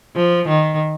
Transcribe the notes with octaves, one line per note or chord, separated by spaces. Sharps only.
F3
D#3